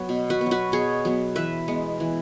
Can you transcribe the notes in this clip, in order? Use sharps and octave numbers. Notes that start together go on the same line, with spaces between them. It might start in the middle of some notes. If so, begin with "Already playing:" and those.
Already playing: F#3 B3
B2
F#4 B4
B3
F#3
F#4 B4
B2 G#4 C#5
F#3 B3
E3 B4 E5
G#3 B3
E3